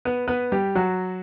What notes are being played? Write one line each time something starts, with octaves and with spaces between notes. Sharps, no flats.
B3 B4
B3 B4
G3 G4
F#3 F#4